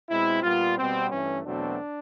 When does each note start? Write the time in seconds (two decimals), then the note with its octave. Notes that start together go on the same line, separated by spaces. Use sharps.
0.09 B2 G#3 C4 E4
0.43 A#2 G3 B3 F4
0.78 B2 G3 B3 C4
1.11 G2 E3 A3 C#4
1.45 E2 B2 F#3 A3 C4 D4